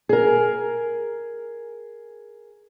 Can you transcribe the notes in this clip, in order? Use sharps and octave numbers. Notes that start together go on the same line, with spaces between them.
G#4 A#4